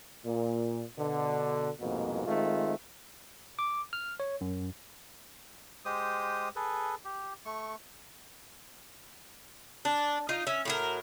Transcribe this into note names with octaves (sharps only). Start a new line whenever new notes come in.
A#2
B2 D3
C2 F2 G#2 B2 A#3
D#3 G#3 A3 C4 F4
D6
F6
C#5
F#2
G#3 G4 C5 D#6
G#4 A4 B4
G4
A3 C#6
D4
D#4 F4
C#4 E5
A2 F#3 A#4